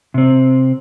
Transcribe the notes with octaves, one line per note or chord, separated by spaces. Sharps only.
C3 C4